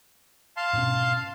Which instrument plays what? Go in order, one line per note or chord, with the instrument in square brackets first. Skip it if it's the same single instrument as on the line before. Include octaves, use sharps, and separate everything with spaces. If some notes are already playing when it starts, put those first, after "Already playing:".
[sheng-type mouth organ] F5 A5 C6
[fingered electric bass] G#2 B2 C#4